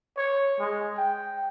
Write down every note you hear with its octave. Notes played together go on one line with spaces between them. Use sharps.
C#5
G#3
G5